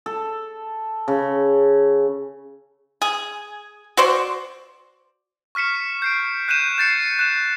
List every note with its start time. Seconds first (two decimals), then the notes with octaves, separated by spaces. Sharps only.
0.06 A4
1.08 C#3
3.02 G#4
3.97 F#4 C5 D5
5.55 C#6 F6 B6 C#7 E7
6.02 G6 C7 D7
6.48 F#6 G6 D#7 E7
6.78 G6 A6 C7 C#7
7.19 F#6 E7